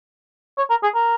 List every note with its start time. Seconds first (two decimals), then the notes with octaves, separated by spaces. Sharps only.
0.58 C#5
0.70 A#4
0.83 G#4
0.95 A#4